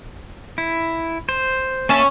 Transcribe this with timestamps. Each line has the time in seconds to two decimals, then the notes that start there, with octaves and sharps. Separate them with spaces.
0.58 E4
1.29 C5
1.89 A#3 C#4 E5 A5